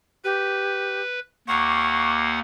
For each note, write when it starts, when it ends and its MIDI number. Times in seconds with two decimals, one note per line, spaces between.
0.24 1.01 67
0.24 1.20 71
1.48 2.39 39
1.48 2.39 58
1.48 2.39 78
1.48 2.12 85